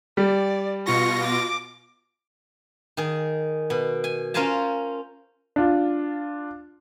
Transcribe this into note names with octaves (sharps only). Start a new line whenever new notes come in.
G3 D5
B2 F4 C#6 A#6
D6
D#3 G#4
B2
G#5
C#4 F4 A#4 C5 G#5 A5
D4 F4